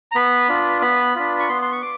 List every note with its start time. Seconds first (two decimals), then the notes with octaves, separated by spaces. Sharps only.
0.12 A#5
0.15 B3 B5
0.49 D4 F4
0.82 B3 B5
1.15 D4 F4
1.40 C#6
1.48 B3 C6
1.62 C6
1.72 C#6
1.82 D6